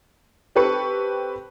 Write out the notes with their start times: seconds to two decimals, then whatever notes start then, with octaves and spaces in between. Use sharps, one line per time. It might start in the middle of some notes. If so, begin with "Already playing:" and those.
0.55 C4 G4 A4 B4 C#6 C#7